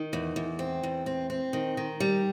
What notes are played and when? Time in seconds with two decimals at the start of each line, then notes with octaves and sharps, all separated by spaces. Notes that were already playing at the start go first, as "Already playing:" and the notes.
Already playing: D#3
0.13 E2
0.36 E2
0.59 C4
0.83 E2
1.06 C4
1.30 C4
1.53 D#3
1.77 D#3
2.00 G3